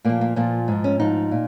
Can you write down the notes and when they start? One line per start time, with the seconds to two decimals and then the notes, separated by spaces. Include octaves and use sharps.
0.05 A#2 F3 A#3
0.21 A#3
0.36 A#2 F3 A#3
0.68 G#2 F3
0.84 C#4
1.00 G#2 F3 D#4
1.31 A#2